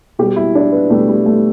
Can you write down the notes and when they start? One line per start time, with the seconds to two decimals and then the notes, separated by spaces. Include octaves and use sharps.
0.19 B2 G4
0.22 G3
0.36 E4
0.55 D4
0.72 B3
0.90 B2 G3 A3
1.09 G3
1.26 A3